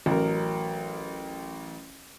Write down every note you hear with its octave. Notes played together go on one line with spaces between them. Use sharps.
A1 F#3 A#4